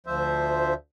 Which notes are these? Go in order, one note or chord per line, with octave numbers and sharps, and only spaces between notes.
D2 F3 C5 E5